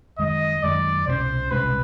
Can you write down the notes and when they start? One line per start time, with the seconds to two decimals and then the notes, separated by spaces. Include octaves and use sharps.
0.19 F#2 D#3 G#3 D#5
0.63 F#2 D#3 G#3 D5
1.07 C2 B2 G#3 C#4 C5
1.51 C2 B2 G#3 C#4 B4